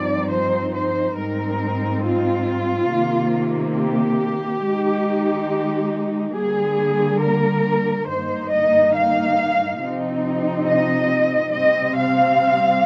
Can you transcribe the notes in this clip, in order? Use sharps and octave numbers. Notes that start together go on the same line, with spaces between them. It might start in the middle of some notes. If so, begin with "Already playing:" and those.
Already playing: G2 F3 C4 D#4 D5
C5
C5
G#2 G3 C4 D#4 A#4
F4
C3 D#3 A#3
G4
D#3 G#3 D#4
D3 G3 A#3 G#4
A#4
G2 D#3 A#3 D#4 C5
D#5
F5
C3 F3 C4 D#4
D#5
C3 G3 C4 D#5
F5